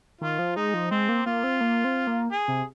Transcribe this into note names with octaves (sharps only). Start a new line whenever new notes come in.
D#3 F4
F3
G#3 D#4
F3
G#3 C4
A#3
A#3 F4
C4
A#3
C4
A#3
G#4
C3